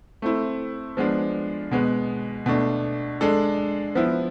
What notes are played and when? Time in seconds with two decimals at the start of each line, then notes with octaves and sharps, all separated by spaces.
0.22 A3 C4 E4
0.97 F3 G#3 B3 D4
1.71 B2 G#3 B3
2.46 B2 A3 D4
3.21 G#3 D4 A4
3.95 F3 B3 E4